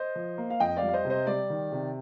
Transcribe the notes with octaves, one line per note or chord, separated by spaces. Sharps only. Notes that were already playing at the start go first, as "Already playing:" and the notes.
Already playing: C5 D#5
F3
A#3
F5
F2 D#5 G5
D5 F5
G3
F5
C5 D#5
C3
C5 D#5
G3 D5
D#3
C3